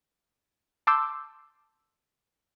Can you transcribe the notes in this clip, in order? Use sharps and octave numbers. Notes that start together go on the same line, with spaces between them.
A5 C6 D6 E6 G6